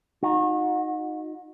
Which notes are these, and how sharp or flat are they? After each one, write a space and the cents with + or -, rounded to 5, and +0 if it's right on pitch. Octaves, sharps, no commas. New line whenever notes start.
D#4 +0 F#4 -35